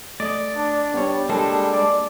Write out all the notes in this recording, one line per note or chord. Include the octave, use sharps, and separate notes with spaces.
A3 D5 D#5
D4
G3 B3 D4 C#5
G3 G#3 A#3 D4 A4
D5